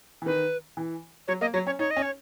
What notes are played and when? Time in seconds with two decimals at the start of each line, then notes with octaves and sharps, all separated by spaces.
0.22 E3
0.26 D#3 B4
0.77 E3
1.28 F#3 C#5
1.41 A#3 D#5
1.53 F#3 C#5
1.66 C#4 C#5
1.79 D#4 C#5
1.91 D#5
1.97 C#4
2.02 C#5